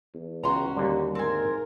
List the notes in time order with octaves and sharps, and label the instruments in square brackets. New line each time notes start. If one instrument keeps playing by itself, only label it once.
[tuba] E2
[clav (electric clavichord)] C#2 [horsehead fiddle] C#4 F#4 [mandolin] A#5 C6
[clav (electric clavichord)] D#2 D3 [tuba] G3
[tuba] G#2 [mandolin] C4 G#5 [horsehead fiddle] A#4